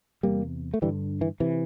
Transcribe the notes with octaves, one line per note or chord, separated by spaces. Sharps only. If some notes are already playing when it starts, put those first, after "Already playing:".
E2 C3 G3 A#3
A3
G2 D3 E3 G3
E3
C3 E3